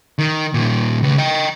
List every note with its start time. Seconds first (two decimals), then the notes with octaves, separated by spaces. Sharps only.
0.19 D#3
0.54 A#2 D#3
1.02 C#3 B4
1.18 D#5 G5